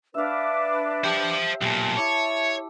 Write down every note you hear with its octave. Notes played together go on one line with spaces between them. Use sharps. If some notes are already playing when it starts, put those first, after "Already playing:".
D4 B4 E5 F5 D6
G4 C5 A5
B1 A#2 G4 A5
E4 C#5 A5 D6